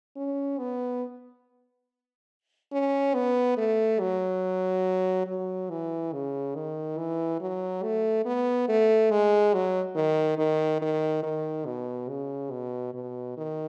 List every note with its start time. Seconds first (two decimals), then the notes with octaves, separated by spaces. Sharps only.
0.16 C#4
0.59 B3
2.72 C#4
3.14 B3
3.57 A3
4.00 F#3
5.27 F#3
5.70 E3
6.13 C#3
6.55 D#3
6.98 E3
7.40 F#3
7.83 A3
8.25 B3
8.69 A3
9.11 G#3
9.54 F#3
9.96 D#3
10.38 D#3
10.82 D#3
11.23 D#3
11.66 B2
12.09 C#3
12.51 B2
12.94 B2
13.37 D#3